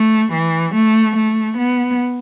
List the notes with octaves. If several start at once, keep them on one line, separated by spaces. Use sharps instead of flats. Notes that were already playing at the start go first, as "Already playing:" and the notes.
Already playing: A3
E3
A3
A3
B3